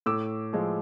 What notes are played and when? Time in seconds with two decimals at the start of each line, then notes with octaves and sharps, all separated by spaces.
0.06 A2 D6 E6
0.53 F3 G#3